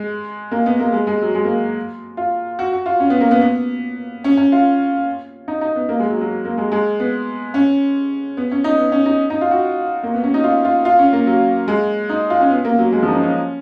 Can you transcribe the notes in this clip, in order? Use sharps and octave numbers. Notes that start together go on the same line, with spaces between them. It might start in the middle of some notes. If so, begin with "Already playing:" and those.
Already playing: G#3
A#3
B3
A#3
G#3
G#3
F#3
G#3
A#3
F4
F#4
F#4
F4
C#4
B3
A#3
B3
B3
C#4
C#4
F4
D#4
D#4
B3
A#3
G#3
F#3
F#3
A#3
G#3
G#3
B3
C#4
B3
C#4
D#4
B3
C#4
D#4
D#4
F4
F#4
A#3
B3
C#4
D#4
F4
F4
F4
C#4
A#3
F#3
G#3
D#4
F4
C#4
B3
A#3
F#3
G#3
F3
D#4
C#4
C#4